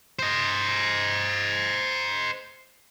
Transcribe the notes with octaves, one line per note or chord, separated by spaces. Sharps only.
C5 D#5